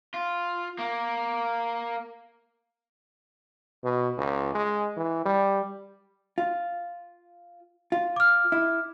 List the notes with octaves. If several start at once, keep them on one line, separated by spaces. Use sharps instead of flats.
F4
A#3
B2
C#2
G#3
E3
G3
F4
F4
D6 F6
E4